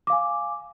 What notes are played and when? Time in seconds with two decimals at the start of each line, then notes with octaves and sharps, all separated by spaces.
0.07 D6
0.10 F5
0.13 G#5